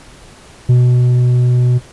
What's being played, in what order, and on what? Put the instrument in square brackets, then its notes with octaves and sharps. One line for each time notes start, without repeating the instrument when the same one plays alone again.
[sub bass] B2